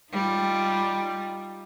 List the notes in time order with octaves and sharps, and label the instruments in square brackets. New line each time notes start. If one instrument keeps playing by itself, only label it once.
[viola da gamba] G3 D#4 F4